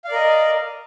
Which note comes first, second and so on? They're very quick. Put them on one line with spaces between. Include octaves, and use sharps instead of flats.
F5 D5 A#4 D#5